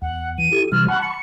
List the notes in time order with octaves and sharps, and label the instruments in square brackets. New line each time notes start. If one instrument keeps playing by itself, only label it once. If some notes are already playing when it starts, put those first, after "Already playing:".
[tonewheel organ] E2 [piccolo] F#5
[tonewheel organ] E3 [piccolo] D#7
[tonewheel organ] E4 G4 A4
[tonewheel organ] C3 E3 G3 [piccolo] F6
[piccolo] F#5 [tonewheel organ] A5 B5 C#6
[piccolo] C#7